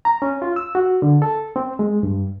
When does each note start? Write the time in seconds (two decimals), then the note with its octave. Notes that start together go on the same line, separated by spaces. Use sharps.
0.05 A#5
0.22 C#4
0.42 F4
0.56 E6
0.75 F#4
1.02 D3
1.22 A4
1.56 C4
1.79 G#3
2.03 G2